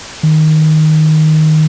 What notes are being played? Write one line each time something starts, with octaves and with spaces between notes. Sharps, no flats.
D#3